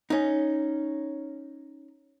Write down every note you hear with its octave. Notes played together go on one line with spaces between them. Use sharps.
C#4 D#4